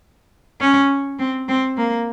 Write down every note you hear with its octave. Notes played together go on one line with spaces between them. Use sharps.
C#4
C4
C4
A#3